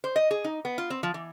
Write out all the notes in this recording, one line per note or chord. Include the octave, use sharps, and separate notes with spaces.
C5
D#5
G#4
D#4
B3
F4
C4
F3
E3